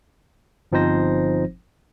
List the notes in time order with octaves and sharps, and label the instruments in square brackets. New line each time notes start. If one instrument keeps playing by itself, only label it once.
[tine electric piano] G1 F3 C4 D#4 C5 A#6